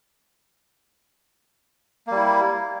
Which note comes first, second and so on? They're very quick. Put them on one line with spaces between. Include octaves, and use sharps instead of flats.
A#3 G3 E4